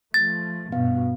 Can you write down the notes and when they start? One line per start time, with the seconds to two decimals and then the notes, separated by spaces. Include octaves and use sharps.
0.14 F3 A3 A6
0.72 G2 B2 B3 F5